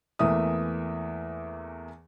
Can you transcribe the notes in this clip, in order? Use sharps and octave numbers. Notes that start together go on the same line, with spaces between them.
E2 E3 A3 A#3 E5 D#6